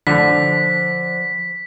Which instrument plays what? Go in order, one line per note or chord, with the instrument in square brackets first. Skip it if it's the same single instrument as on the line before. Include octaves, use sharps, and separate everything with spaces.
[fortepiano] D3 [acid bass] F3 [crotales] B6